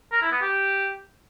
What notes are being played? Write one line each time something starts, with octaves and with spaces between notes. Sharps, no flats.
A#4
E4
B3
G4